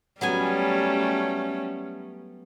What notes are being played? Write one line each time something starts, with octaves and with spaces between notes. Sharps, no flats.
F#3 G3 A3 B3 C#4 G#5